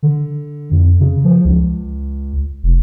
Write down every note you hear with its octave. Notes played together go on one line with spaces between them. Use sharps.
D3
F2
C#3
F3
C#2
F1